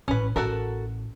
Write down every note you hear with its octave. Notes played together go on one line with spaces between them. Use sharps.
A1 C#4 B4
A1 F#4 A4 A#4